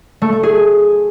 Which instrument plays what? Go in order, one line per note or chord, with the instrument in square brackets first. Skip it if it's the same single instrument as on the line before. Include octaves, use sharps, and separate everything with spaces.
[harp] A3
A3
G#4